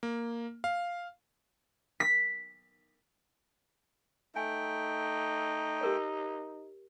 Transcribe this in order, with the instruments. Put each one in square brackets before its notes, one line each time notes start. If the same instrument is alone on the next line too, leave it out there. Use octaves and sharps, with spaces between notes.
[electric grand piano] A#3
F5
[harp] B6
[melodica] A3 G5 [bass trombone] D#4 [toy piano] E5 G#5
[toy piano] G4 A#4 C#5